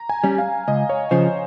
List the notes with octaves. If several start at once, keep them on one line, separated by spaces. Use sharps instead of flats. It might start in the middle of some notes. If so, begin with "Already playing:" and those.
Already playing: A#5
G#5
G3 C#4
F5
C#2 D#5
C#5
C#3 F3 C5